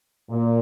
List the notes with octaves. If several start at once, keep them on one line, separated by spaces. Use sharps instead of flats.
A#2